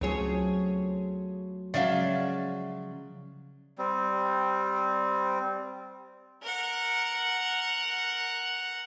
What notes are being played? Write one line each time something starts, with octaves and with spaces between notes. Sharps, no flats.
C#2 F#3 A3 C4 F4 G#4 C#5
C#3 F3 F#3 G#3 D5 E5 F5
G3 C4
A#4 F#5